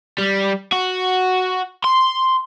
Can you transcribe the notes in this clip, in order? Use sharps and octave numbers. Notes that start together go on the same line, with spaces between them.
G3
F#4
C6